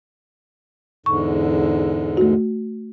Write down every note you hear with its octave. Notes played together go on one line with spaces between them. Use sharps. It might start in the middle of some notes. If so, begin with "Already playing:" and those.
E2 G#2 D3 C#6
A3 F#4